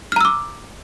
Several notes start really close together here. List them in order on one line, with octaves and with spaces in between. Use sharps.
F6 A#5 E6 D6